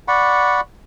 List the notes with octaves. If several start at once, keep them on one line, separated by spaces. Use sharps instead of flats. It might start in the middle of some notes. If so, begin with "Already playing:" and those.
D5 F#5 B5 C#6